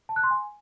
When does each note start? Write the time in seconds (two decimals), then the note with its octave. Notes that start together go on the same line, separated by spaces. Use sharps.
0.09 A5
0.16 F#6
0.23 C6
0.31 G#5